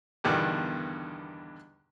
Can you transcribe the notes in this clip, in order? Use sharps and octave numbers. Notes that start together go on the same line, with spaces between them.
E2 G2 B2 D3 D#3